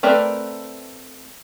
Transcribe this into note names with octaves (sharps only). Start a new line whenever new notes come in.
A3 C4 A#4 B4 D5